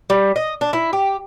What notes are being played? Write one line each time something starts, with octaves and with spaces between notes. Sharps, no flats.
G3
D#5
D4
E4
G4